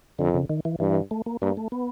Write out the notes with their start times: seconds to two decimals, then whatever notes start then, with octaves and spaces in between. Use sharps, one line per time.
0.19 F2 D3
0.34 C#3
0.49 D#3
0.65 E3
0.80 G2 E3
1.11 A3
1.26 A#3
1.42 G2 A#3
1.57 A3
1.72 B3